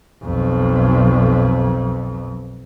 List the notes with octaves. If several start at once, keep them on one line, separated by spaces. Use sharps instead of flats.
B1 F2